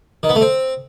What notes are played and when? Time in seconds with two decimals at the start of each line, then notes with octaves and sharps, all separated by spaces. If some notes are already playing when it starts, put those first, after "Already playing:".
0.23 D#3
0.29 B3
0.35 A3
0.41 C4